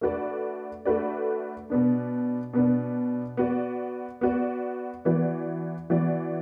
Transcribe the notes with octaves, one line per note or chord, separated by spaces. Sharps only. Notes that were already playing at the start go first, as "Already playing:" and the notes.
A3 D4 F#4 B4 D5
A3 D4 F#4 B4 D5
B2 B3 D4
B2 B3 D4
B3 F#4 D5
B3 F#4 D5
E3 B3 F#4 D5
E3 B3 F#4 D5